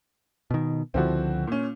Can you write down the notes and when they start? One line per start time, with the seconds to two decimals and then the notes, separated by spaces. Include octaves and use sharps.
0.51 B2 D#3
0.94 C#2 D3 F3 C4 E4 F#4
1.47 A#2 C#4